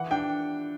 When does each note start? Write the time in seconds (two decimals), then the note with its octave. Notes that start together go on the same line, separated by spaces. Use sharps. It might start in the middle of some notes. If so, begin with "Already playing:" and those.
Already playing: E3 F#5
0.11 D4 G5